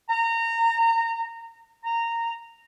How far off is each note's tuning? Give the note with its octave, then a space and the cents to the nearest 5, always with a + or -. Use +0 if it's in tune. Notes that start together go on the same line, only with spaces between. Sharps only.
A#5 -25
A#5 -15